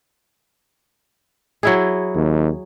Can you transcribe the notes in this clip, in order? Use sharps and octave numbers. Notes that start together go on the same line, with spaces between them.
F#3 E4 G#4
D#2